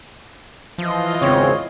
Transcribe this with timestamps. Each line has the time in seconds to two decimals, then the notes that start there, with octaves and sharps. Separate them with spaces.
0.78 E3 F3 F4 D#5
1.22 G#1 E2 C#3 C4 C#5